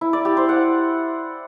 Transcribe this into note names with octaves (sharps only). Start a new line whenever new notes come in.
E4
D5
G4
C5
F#5